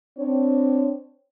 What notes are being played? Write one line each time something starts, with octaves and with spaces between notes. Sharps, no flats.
C4 D4 C#5